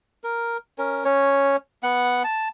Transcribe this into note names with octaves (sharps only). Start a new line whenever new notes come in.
A#4
C#4 A#4
C#4 C#5
B3 F#5
A5